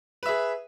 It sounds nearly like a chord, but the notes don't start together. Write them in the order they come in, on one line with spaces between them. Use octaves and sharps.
B4 E5 G#4